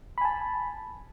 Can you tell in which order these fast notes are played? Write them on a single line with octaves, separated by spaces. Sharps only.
B5 G#5 A5